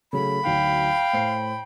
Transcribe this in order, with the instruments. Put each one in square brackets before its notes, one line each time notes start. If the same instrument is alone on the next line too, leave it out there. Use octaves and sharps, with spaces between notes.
[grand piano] C#3 F#3 A3 [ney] B5
[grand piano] D2 F#3 D#4 [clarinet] F5 [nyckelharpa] G5
[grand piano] A2 C5 C7